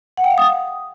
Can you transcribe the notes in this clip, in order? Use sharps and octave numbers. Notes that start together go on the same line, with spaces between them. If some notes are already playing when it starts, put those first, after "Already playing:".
F#5
G5
F5
D#6